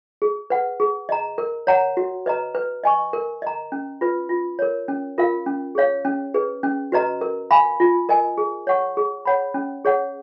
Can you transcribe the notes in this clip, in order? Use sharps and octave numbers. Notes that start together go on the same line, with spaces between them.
G#4
B4 F#5
G#4
D#5 A#5
A#4
C#5 F#5 A#5
F#4
B4 D#5 A#5
B4
D#5 G#5 C#6
A#4
D#5 A#5
C#4
F4 B4
F4
A#4 C#5
C#4
F4 A#4 F5
C#4
G#4 C#5 F5
C#4
G#4 B4
C#4
F#4 B4 D#5 A#5
A#4
F5 G#5 B5
F4
A#4 D#5 G#5
G#4
C#5 F#5 C#6
G#4
C#5 F#5 B5
C#4
G#4 C#5 F#5